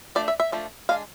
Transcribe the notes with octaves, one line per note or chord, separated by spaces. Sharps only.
F3 A3 D4 D5
E5
E5
F3 A3 D4
G#3 D4 F5